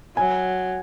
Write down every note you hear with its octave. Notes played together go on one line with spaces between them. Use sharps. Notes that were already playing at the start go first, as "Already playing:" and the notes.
F#3 G#5